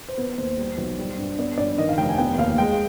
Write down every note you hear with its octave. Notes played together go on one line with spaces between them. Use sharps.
C5
B3 B4
D#2 C5
G3
B1
G3
G2
B3 D5
G2 D5
D#3 D#5
F5
F1 G5
G#5
B3 G5
D#2 F5
G#3 G5